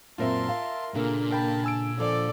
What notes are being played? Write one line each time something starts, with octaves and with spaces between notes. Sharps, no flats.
F#2 A#2 C4 F4 A#4 E5 A5 C6
F5
A#2 C#3 A#3 D4 A4
A#4 G5 A5 B5
G#5 E6 D7
D3 F3 A4 D5